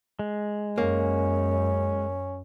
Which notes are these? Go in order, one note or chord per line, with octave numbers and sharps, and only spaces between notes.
G#3
F#2 A#3 C#4